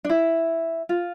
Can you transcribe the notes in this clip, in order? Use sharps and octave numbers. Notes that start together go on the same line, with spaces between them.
D4
E4
F4